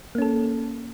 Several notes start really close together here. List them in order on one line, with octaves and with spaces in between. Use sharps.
A#3 C#4 A4